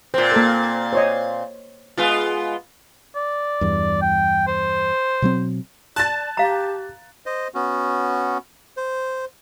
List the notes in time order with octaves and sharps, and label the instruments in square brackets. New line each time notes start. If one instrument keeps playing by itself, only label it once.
[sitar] A#2 C4 [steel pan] C5
[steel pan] A#3 A4 A#4
C5 C#5 D#5
[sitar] G#3 B3 F4
[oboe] D5
[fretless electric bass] E2 G2
[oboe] G5
C5
[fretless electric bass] B2 F#3 C4
[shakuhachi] D5 [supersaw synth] A5 [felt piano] F#6 A6
[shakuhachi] G4 [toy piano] F5 A#5
[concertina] C5 D#5
B3 C#4 F#4
C5